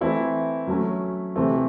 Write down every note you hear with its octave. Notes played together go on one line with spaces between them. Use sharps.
E3 A3 C4 E4
F#3 A3 C#4
C3 E3 A3 C4